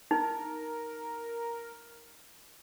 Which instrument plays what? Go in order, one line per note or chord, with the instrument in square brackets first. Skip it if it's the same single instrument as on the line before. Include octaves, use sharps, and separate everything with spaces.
[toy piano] D#4 [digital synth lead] A#4